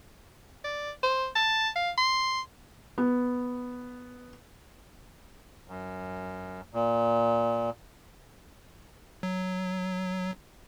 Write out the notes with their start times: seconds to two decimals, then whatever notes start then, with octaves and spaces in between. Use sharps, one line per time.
0.64 D5
1.03 C5
1.35 A5
1.76 F5
1.98 C6
2.98 B3
5.68 F#2
6.74 A#2
9.23 F#3